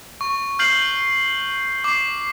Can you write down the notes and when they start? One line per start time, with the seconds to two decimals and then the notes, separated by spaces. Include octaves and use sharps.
0.21 C#6
0.59 F6 G6 C7 F#7
1.84 D6 C7